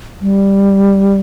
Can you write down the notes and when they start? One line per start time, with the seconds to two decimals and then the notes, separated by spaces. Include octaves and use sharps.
0.21 G3